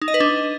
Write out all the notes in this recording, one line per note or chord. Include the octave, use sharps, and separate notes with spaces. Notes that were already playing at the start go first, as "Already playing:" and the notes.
D#4
D#5
B4
D4